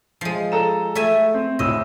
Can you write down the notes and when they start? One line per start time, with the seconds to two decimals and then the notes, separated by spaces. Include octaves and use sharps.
0.21 F3 G#3
0.52 A4 A#5 E7
0.95 A3 E5 G#5
1.34 C4
1.59 D1 E4 D#5 E6